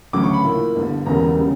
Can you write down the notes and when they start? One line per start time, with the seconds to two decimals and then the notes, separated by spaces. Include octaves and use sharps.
0.13 D2 C#3 F#3 D6
0.24 C#6
0.34 B5
0.44 A#2 A#3 E4
0.76 G1 G2 D3
1.06 E1 E2 C#3 G3 A#3 A#5
1.38 C#3 G3